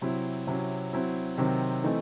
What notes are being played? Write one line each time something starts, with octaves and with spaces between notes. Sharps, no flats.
C3 F#3 C4 E4
C3 F#3 C#4 E4
F#3 C4 E4
C3 D#3 F#3 C4
E3 A3 C4 D#4